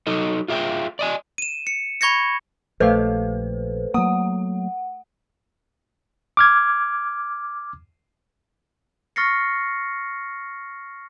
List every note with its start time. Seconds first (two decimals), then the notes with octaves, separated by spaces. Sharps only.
0.07 F#3 D#4 A4 D#5
0.48 F4 G#4 E5 F5 G5
0.99 D5 D#5 G#5
1.38 D#7 E7
1.67 C#7
2.01 B5 C#6 G#6 A#6 C#7
2.80 A#1 A3 G4 A4 B4 C5 F5
3.94 F#3 A3 A#3 F#5 D#6
6.37 D6 F6 G#6
9.16 C#6 F6 A6 A#6 C7 C#7